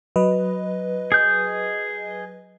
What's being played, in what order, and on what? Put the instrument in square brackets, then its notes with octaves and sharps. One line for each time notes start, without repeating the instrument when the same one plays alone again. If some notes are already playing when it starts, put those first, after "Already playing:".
[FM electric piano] F#3 B4 D#5
[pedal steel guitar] G#4 G6